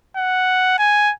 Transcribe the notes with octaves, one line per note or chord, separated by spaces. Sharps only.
F#5
G#5